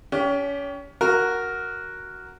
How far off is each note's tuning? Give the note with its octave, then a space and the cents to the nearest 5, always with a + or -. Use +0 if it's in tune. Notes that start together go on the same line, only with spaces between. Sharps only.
C#4 +30 G4 +0
F#4 +0 A#4 +0